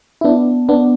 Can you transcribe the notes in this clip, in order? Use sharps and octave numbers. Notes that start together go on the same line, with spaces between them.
E4
B3 D4
B3 D4